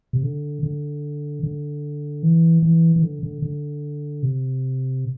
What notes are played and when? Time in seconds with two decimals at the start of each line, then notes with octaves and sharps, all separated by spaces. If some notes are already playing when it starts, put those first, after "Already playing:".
0.13 C3
0.23 D3
0.63 D3
1.43 D3
2.23 E3
2.63 E3
2.96 E3
3.02 D3
3.23 D3
3.42 D3
4.23 C3